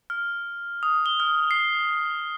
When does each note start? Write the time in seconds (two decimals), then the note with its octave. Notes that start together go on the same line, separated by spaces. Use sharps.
0.10 F6
0.83 D#6
1.06 G7
1.20 F6
1.51 C7